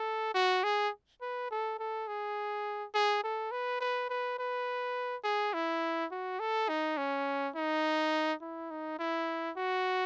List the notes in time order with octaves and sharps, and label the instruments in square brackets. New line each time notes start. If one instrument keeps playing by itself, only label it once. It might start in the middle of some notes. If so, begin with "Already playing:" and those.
Already playing: [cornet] A4
F#4
G#4
B4
A4
A4
G#4
G#4
A4
B4
B4
B4
B4
G#4
E4
F#4
A4
D#4
C#4
D#4
E4
D#4
E4
F#4